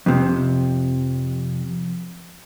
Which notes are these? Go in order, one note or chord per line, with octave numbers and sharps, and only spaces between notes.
F2 C3